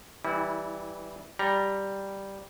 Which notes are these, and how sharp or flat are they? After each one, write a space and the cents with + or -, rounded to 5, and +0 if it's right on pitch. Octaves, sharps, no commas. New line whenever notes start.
E3 +0 G3 +5 E4 -30
G3 +0 A#5 +0